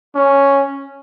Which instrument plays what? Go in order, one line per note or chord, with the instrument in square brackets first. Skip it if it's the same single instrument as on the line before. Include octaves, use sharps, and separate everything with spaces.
[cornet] C#4